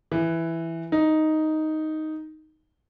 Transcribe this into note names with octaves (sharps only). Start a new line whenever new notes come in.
E3
D#4